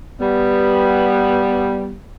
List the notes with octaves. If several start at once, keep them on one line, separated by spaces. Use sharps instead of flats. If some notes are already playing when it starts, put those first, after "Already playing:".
G3 B3